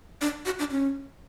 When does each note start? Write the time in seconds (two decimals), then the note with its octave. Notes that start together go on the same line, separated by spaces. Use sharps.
0.21 D4
0.45 F#4
0.59 D4
0.71 C#4